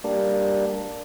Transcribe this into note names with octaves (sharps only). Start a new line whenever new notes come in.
G3 A#3 D4